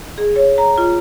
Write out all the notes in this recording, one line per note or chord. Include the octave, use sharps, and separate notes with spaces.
G#4
C#5
A#5
F4